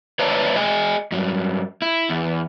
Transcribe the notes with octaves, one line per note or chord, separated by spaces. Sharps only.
B4 C#5 D5 E5 A5 A#5
G#4 D#5 G5 G#5
G2 F#3
E4
E2